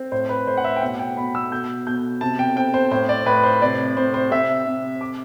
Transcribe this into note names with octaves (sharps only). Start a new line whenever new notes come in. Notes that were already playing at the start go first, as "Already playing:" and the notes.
Already playing: C4
A2 C5
B4
A2 C5
F#5
E5
G5
B2 F#5
G5
B2 B5
E6
B2 G6
B2 G6
C3 A5
G5
C4 G5
C5
A2 C5
D5
A2 B4
C5
C3 D5
C3 C5
C5
C3 E5
C3
D6